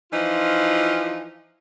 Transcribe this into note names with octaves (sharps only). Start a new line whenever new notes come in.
E3 F3 D#4 F4